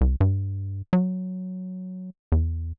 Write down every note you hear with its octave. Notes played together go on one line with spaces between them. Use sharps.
C2
G2
F#3
E2